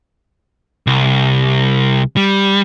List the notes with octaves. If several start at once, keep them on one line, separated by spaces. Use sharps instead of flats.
C2
G3